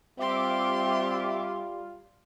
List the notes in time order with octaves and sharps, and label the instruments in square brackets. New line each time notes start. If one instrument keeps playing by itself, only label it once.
[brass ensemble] G3 F4 [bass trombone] C4 [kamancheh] G4 C6 [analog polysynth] E5 D6